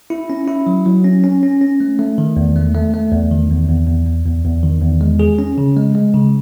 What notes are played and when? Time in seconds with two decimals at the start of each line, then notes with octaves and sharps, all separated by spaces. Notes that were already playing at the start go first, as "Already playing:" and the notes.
0.10 E4
0.30 C#4
0.48 E4
0.67 F#3
0.86 F#3
1.04 C#4
1.24 C#4
1.43 C#4
1.61 C#4
1.80 A3
1.99 A3
2.18 D#3
2.37 E2
2.56 A3
2.74 A3
2.94 A3
3.12 E2
3.31 D#3
3.50 E2
3.69 E2
3.87 E2
4.07 E2
4.25 E2
4.45 E2
4.63 D#3
4.82 E2
5.01 G#3
5.20 G#4
5.39 C#4
5.58 C#3
5.76 G#3
5.95 G#3
6.14 C#3